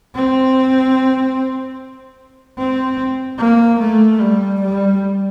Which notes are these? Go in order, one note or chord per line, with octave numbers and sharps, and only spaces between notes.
C4
C4
A#3
A3
G3
G3